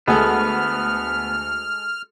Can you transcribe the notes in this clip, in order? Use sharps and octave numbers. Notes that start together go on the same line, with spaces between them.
D2 G#3 B3 G#4 A4 F6